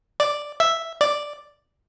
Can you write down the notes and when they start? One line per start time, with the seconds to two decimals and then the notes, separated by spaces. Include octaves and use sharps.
0.20 D5
0.60 E5
1.01 D5